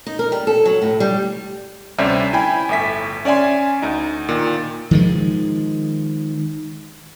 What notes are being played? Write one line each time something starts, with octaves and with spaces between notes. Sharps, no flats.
D#4
A#4
G3
A4
F#3
A2
G3
D2 C3 G3 C#4 C5 E5
E4 G5 G#5 B5
G1 A2 E5 B6
C#4 D5 E5 G#5 C6
D2 D#4
A#2 D#3
D#3 F3 G#3